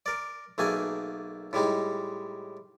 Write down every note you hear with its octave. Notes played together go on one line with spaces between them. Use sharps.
A#4 D5
B1 A3 A#3 G#4 G#5
A2 G3 G#3 D#4